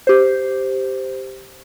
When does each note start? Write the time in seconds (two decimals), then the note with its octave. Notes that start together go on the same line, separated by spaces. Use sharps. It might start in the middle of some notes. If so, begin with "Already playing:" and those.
0.07 G4 C5